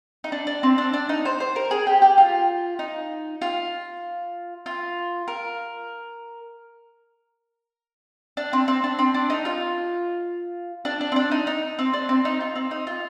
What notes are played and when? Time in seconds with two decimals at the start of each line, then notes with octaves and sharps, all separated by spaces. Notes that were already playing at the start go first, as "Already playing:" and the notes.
0.24 D#4
0.32 D4
0.47 D4
0.63 C4
0.78 D4
0.93 D4
1.09 D#4
1.25 C5
1.40 C5
1.56 A#4
1.71 G#4
1.87 G4
2.02 G4
2.18 F4
2.79 D#4
3.42 F4
4.66 F4
5.28 A#4
8.37 D4
8.53 C4
8.68 C4
8.84 D4
8.99 C4
9.14 D4
9.30 D#4
9.45 F4
10.85 D4
11.01 D4
11.12 C4
11.16 D4
11.32 D#4
11.47 D#4
11.79 C4
11.93 D4
12.09 C4
12.25 D#4
12.40 F4
12.56 C4
12.71 D#4
12.87 F4